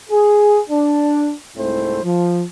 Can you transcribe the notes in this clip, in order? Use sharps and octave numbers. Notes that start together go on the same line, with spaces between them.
G#4
D4
C2 G#2 A3 C4 E4 C5
F3